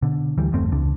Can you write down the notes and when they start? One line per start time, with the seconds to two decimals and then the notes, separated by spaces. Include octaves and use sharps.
0.02 B2 D3
0.38 D2 E3 G3
0.52 G1 E2 A3 C4
0.72 C#2 D4